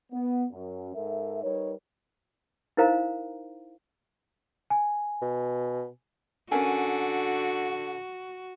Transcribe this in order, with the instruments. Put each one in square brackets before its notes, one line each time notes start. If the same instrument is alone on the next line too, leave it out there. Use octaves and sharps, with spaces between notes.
[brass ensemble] B3
F#2
G#2 A4 A#4 E5
G3 D#4 A#4 B4 C#5
[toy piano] D#4 E4 A#4 C5 F5 A#5
[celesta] G#5
[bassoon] B2
[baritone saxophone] D3 [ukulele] C#4 A#4 G#5 [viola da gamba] F#4